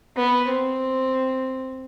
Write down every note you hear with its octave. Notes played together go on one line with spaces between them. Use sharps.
B3
C4